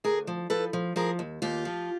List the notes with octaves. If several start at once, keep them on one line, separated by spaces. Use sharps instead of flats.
D2 G#4 A#4
F3
F3 A4 B4
F3
F3 G#4 A#4
D#2
D#2 F4 G4
F3